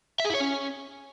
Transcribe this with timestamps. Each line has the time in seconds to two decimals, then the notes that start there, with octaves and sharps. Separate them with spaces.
0.20 E5
0.25 G#4
0.30 E4
0.35 C#5
0.40 C#4